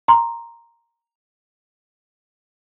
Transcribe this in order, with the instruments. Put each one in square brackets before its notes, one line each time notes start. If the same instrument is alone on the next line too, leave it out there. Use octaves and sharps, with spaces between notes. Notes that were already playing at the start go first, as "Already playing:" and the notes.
[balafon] A#5 C6